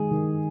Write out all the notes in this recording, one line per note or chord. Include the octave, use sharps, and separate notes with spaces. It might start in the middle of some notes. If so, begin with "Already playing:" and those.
Already playing: D#3 G#3 G#4
D#3